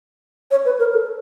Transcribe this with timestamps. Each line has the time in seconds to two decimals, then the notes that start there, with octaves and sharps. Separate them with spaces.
0.51 C#5
0.65 B4
0.79 A#4
0.94 A4